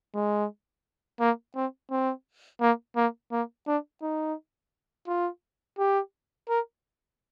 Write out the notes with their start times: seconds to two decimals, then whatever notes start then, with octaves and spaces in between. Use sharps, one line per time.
0.14 G#3
1.20 A#3
1.55 C4
1.90 C4
2.61 A#3
2.96 A#3
3.31 A#3
3.67 D4
4.02 D#4
5.07 F4
5.78 G4
6.49 A#4